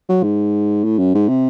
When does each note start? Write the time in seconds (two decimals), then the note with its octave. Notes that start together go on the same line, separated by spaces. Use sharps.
0.09 F#3
0.23 G#2
0.84 A2
0.98 F#2
1.14 G#2
1.28 C3